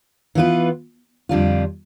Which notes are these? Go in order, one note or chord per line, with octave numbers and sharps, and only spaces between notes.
E3 B3 F4 B4
F2 D3 G3 D4 F4